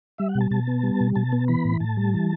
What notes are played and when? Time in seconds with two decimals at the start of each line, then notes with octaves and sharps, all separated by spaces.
0.18 G3 E5
0.29 F#5
0.35 B2
0.41 A5
0.51 B2 A5
0.67 B3
0.83 G3
1.00 B2
1.15 B2 A5
1.32 B3
1.48 E3 B5
1.65 A2
1.80 A2 A5
1.97 G3
2.14 E3